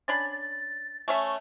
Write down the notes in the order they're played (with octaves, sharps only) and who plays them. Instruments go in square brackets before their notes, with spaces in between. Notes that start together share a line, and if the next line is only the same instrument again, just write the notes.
[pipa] C#4 D4 B5 [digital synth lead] A6
[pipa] A3 C#4 E5